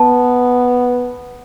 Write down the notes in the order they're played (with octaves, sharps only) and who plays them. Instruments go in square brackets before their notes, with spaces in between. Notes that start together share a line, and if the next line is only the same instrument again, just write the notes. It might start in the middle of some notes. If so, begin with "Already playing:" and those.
Already playing: [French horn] B3 [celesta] A5